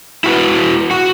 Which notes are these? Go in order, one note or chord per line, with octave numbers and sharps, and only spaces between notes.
E4 F#4 B4
F#4